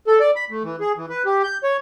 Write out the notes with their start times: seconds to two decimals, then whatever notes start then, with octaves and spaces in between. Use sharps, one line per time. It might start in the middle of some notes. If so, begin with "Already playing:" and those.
0.07 A4
0.20 D5
0.36 B5
0.50 A3
0.63 E3
0.80 G#4
0.96 E3
1.09 B4
1.26 G4
1.43 G6
1.63 C#5